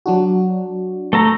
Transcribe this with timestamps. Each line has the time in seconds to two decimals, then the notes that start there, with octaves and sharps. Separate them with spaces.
0.06 F#3 D4 F#4
1.13 A3 A4 A#5